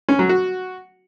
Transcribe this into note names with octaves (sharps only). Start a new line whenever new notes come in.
C#4
F#3
F#4